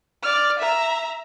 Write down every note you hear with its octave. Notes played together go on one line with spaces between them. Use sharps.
D5 F6
E5 A#5